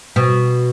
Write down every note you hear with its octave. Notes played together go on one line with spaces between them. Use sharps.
B2